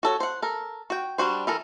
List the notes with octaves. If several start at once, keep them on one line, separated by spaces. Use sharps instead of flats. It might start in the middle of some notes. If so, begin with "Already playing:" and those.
F#4 A4 C#5
C5 F#5
A4 A#4
F#4 G5
G3 D4 F#4 C5
E3 A4 A#4